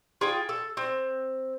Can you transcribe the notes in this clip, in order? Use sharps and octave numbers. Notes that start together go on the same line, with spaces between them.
F4 G#4 G5
A4
C4